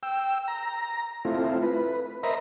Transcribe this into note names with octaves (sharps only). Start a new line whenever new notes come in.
G5 E6
A#5
A3 C4 E4 F4
B4
A#4 C5 D#5 E5 A#5 B5